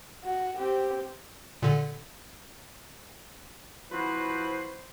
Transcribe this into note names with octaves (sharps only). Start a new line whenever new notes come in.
F#4
C4 G4
A#2 D3
F3 C4 E4 F#4 B4 C5